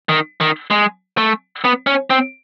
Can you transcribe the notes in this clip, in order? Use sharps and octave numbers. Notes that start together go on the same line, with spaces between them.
D#3
D#3
G#3
A3
B3
C#4
C4